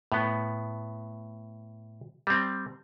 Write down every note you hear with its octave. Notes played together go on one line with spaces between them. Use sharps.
A2 B3
G3 C4